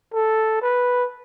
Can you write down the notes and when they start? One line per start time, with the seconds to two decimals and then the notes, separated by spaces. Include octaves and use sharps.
0.14 A4
0.62 B4